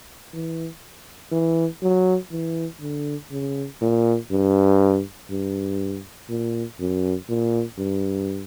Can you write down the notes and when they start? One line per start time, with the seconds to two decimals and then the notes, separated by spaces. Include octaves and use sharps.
0.33 E3
1.32 E3
1.82 F#3
2.31 E3
2.81 D3
3.32 C#3
3.81 A#2
4.31 G2
5.30 G2
6.29 A#2
6.80 F#2
7.29 A#2
7.78 G2